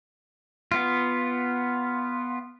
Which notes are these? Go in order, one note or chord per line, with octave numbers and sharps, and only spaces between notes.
B3 F4